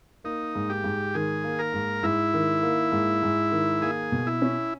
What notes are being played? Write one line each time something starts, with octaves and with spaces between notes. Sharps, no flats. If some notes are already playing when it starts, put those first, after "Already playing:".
A#3 D#4
G#2
G4
G#2
D#3 G#4
A#3
A#4
G#2
G#2 E4
D#3
A#3
G#2
G#2
D#3
A#3 G#4
B2
E4
C#4